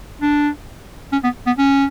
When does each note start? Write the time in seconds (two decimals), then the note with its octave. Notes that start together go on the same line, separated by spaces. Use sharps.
0.22 D4
1.12 C#4
1.24 B3
1.47 B3
1.58 C#4